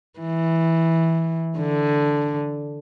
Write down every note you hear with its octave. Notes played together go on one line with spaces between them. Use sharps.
E3
D3